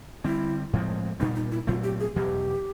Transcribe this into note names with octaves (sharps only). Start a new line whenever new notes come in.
D3 G3 C4 E4
A2 F3 G#3 C4
A#2 G3 B3 D#4
D#4
E4
A#2 F#3 A3 C4 F4
G4
G#4
E2 B2 F#3 G4